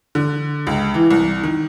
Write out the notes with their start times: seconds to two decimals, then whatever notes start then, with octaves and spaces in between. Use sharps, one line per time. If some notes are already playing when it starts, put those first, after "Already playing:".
0.15 D3
0.67 C#2
0.94 E3
1.11 C2
1.43 D#3